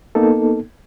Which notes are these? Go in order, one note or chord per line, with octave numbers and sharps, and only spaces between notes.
A#3 B3 D#4 A4